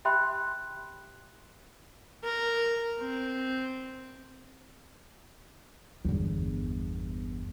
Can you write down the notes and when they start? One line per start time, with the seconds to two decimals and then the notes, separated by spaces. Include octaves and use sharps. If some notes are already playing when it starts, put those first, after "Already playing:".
0.05 G4 E5 G5 B5 C6 F#6
2.24 A#4
2.99 C4
6.05 G1 E2